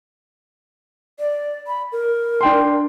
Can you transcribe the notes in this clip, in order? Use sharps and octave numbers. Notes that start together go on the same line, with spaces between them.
D5
B5
A#4
D4 G5 C6